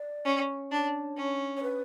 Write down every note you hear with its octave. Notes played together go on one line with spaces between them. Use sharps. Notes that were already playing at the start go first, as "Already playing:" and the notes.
Already playing: D5
C#4
D4 C#5
C#4
C#5
B4